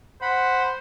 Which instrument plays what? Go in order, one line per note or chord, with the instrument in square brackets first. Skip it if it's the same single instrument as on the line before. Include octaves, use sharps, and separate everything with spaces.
[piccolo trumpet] C5 [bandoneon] F#5 B5